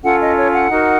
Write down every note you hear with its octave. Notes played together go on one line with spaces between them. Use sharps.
C#4 F4 A4 F#5
D#5
C#5
F#5
D#4 F#4 A#4